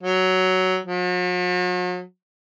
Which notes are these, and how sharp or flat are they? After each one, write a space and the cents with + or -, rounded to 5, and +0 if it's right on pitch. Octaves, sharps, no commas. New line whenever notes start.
F#3 +10
F#3 -45